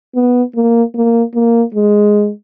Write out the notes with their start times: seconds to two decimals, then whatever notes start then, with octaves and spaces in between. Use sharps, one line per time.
0.15 B3
0.55 A#3
0.95 A#3
1.35 A#3
1.74 G#3